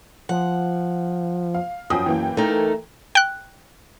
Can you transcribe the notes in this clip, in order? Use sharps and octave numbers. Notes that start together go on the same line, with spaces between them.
F3 F#5
F5
F#2 F3 G5 D#6
E3 A#3 G5
A3 D#4 A#4
G5 F#6